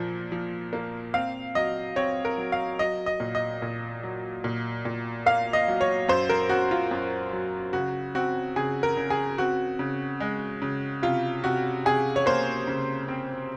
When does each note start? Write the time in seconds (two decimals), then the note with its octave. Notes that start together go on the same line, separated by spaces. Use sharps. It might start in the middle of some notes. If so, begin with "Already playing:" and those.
Already playing: A#2 F3
0.32 F3
0.73 A#3
1.14 C4 F5
1.55 F#3 D#5
1.96 C4 C#5
2.25 A#4
2.37 F#3
2.52 F5
2.79 F#3 D#5
3.06 D#5
3.20 A#2
3.35 D#5
3.62 A#2
4.03 F#3
4.44 A#2
4.85 A#2
5.26 A#3 F5
5.53 D#5
5.68 F#3
5.81 C#5
6.08 F#2 C5
6.29 A#4
6.49 F#2 F#4
6.71 F4
6.91 F#2
7.33 F#3
7.73 C#3 F#4
8.15 C4 F#4
8.56 C#3 G#4
8.83 A#4
8.97 C#3
9.10 G#4
9.38 C4 F#4
9.79 C#3
10.20 G#3
10.62 C#3
11.03 C3 F4
11.44 C3 F#4
11.85 C3 G#4
12.16 C#5
12.26 A#3 C5
12.67 C#3
13.08 C4